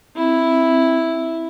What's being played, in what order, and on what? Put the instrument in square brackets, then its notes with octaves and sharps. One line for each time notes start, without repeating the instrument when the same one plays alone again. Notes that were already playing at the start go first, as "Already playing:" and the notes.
[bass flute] C4 [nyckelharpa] E4